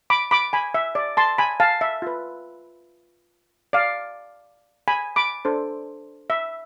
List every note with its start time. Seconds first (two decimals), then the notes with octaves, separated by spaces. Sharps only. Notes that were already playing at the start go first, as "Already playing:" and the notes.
0.10 B5 D6
0.31 B5 D6
0.53 G#5 B5
0.74 E5
0.95 D5
1.17 A5 C6
1.38 G#5 B5
1.60 F5 A5
1.81 E5
2.02 F4 B4
3.73 D5 F5
4.88 G#5 B5
5.16 B5 D6
5.45 D4 A4 C5
6.30 E5